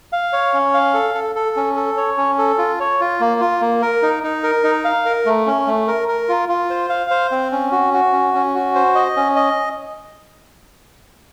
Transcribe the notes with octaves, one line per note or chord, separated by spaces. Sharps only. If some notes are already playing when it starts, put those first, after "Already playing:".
F5
C#5
C#4
F5
A4
A4
A4
C#4
A4
C#5
C#4
A4
F4
C#5
F4
A#3
F4
A#3
A#4
D#4
D#4
A#4
D#4
F5
A#4
A3
C#4
A3
A#4
A#4
F4
F4
C5
F5
C5
C4
C#4
F#4
F#4
C#4
C#4
F#4
C5
D#5
C#4
D#5